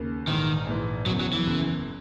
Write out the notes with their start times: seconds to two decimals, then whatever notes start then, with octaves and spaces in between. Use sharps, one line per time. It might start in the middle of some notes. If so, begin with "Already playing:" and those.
Already playing: D#2 C#3
0.27 A#1 G#2 D#3 E3
0.67 A#1 G#2 E3
1.06 F#1 E2 C#3 F#3
1.20 F#3
1.33 E3
1.46 F#1 E2 C#3